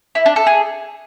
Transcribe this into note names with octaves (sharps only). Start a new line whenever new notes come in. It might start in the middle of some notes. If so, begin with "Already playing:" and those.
E4
D4
A4
G#4